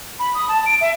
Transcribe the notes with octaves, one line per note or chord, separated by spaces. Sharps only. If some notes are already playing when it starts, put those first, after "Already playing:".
B5
D#6
A5
D7
E5